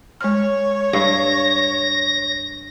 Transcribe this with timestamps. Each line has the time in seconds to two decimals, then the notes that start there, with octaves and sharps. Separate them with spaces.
0.21 G#3 C#5 F6
0.93 G2 A#6